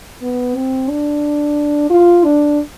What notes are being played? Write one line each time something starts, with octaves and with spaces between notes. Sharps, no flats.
B3
C4
D4
F4
D4